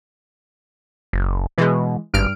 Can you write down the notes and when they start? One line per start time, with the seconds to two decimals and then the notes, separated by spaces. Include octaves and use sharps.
1.13 F#1
1.58 B2 E3 G#3
2.14 G#1 G2 F6 D7